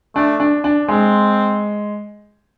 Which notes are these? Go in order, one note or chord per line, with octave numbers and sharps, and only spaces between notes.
A3 D4
D4
D4
G#3 C4